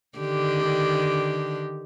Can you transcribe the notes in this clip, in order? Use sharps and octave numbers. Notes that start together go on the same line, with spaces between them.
D3 D#3 G4